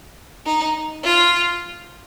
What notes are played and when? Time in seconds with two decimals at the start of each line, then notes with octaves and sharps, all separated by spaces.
0.46 D#4
1.04 F4